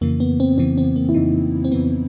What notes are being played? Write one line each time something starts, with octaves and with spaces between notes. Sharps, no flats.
F2 C#3 E3 A#3
B3
C4
F2 C#3 E3 C4
C4
A#3
E4
F2 C#3 E3 D#4
C4
F2 C#3 E3 B3